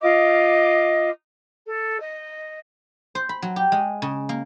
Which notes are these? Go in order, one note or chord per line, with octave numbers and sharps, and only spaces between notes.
F4 D#5 D6
A4
D#5
C5
B5
F#3
G4
G#3
C#3
A#3